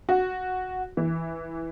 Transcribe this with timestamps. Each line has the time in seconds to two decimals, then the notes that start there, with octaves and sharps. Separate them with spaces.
0.09 F#4
0.97 E3